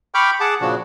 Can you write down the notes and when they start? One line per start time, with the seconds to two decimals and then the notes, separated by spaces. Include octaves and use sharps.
0.15 G5 B5 C#6 D6 F6 G6
0.40 G#4 F#5 A5 D6
0.61 A#2 C#3 F3 D4 F#4